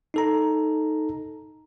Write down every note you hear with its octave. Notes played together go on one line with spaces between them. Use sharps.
D#4 A4 A#5